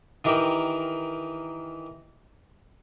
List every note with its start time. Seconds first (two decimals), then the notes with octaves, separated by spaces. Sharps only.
0.24 D#3 E3 G4 A#4